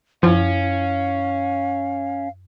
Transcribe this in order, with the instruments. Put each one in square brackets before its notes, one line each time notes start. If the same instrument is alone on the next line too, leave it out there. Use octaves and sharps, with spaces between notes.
[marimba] F#2 E4 [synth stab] F3 [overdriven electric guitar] C#4 [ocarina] F5